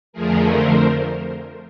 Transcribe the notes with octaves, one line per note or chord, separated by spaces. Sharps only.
F2 D3 F3 A3 G#4 A#4
A#4 C5